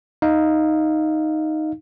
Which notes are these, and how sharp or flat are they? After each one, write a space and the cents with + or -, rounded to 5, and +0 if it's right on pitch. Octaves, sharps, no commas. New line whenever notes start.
D#4 +0 F5 +0